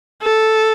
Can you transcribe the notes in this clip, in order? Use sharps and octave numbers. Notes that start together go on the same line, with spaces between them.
A4